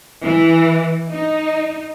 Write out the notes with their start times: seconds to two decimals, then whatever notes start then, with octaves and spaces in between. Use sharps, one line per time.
0.24 E3
1.12 D#4